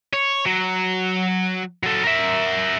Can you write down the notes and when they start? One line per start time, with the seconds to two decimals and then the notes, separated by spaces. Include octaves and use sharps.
0.13 C#5
0.45 F#3
1.83 F#3 A4
2.03 A#4 E5